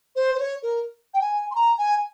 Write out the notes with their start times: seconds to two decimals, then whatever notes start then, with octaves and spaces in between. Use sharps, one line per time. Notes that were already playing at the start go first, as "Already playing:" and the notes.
0.16 C5
0.35 C5
0.39 C#5
0.63 A#4
1.14 G5
1.21 G#5
1.51 C6
1.55 A#5
1.78 G#5